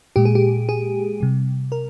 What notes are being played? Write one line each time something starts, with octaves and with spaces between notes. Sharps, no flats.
A#2 G#3 G4
G#4
G4
G#4
C3 G3
A#4